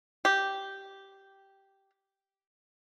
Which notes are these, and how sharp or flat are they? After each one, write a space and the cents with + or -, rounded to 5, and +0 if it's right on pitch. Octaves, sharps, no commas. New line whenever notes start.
G4 -5